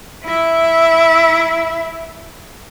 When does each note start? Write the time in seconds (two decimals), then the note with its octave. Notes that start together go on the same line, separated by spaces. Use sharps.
0.25 E4 E5